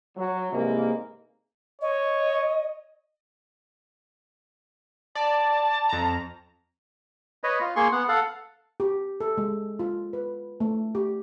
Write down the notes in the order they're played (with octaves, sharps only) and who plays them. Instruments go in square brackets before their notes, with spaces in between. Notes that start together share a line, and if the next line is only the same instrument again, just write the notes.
[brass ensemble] F#3
G#2 C3 E3 G3 G#3 A#3
[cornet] C#5 [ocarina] D#5
[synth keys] D5 [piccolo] A5
[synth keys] F2 A#5
[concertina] B4 C#5 D#5
F4
A#3 G#4 C6 C#6
B3 F#5
A4 F5 F#5
[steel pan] G4
A4
G#3
F4
B4
A3
G4